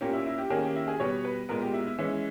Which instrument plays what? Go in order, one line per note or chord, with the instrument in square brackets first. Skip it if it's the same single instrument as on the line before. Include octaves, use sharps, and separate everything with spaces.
[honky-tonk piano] A#2 A#3 C#4 G4
E4
E4
G4
D#3 A#3 C#4 G#4
G4
E4
G#4
B2 G3 B3 C#5
B4
A#2 G#3 B3 A#4
G4
E4
E4
E3 G#3 C#4 E4